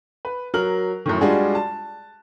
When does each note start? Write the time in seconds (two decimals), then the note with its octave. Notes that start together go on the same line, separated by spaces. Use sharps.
0.25 B4
0.54 F#3 A#4 F6 F#7
1.06 F#2 A2 D#3
1.21 G3 G#3 D4 F4 F#4 G#4
1.55 A5